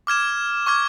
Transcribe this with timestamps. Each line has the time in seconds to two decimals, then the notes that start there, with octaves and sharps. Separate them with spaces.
0.07 D6 F6 G#6 E7
0.66 C#6 D6 F6 G#6